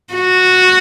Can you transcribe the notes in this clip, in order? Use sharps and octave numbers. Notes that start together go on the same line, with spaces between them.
F#4